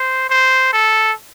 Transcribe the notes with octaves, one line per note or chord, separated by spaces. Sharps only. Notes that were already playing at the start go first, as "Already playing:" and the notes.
Already playing: C5
C5
A4